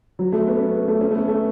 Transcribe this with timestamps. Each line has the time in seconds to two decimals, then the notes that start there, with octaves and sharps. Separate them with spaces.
0.19 F#3
0.32 A3
0.47 B3
0.60 C#4
0.74 B3
0.88 A3
1.01 C#4
1.11 A3
1.15 B3
1.28 A3